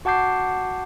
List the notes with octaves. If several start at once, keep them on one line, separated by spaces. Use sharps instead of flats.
F#4 F#5 A5 D6 G6 C7